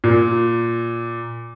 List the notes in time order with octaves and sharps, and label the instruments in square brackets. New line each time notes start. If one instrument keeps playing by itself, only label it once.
[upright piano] A#2